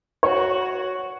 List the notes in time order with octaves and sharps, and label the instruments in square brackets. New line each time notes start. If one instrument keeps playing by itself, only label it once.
[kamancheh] F#4 [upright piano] C#5